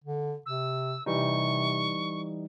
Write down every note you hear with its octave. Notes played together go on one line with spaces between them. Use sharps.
D3
C3 E6
C3 E3 G3 D#4 C#6